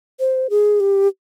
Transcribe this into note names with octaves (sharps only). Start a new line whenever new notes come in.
C5
G#4
G4